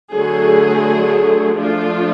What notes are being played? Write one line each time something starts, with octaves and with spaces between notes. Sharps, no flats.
D3 F#3 A3 G#4
F3 A3 D4 F4